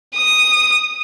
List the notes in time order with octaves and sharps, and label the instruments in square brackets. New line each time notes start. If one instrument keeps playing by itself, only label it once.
[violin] D#6